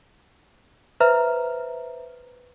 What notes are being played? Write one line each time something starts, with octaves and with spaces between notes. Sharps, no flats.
B4 C5 E5 A#5 F6